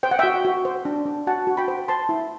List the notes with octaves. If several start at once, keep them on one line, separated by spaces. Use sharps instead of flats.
C5 G5
F#5
F#4 E5 G5
F#4
C5
D4
D4
F#4 F#5 A5
F#4
G5 B5
C5
C5 A5 C6
E4